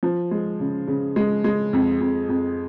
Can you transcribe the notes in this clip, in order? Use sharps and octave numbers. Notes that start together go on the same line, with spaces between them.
F3
G#3
C#3
C#3
G#3
G#3
F2
F2
F2